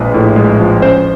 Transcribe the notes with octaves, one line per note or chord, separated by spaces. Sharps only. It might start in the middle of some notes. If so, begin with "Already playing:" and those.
Already playing: A#1 F3 G#3 B4
A2
G#3
F3
C#4 C5